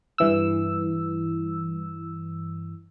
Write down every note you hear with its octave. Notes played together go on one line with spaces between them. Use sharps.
G2 E3 E6